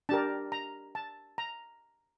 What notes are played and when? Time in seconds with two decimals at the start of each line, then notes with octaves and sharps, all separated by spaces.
0.09 D4 G4 A#4 A5
0.52 A#5
0.95 A5
1.38 A#5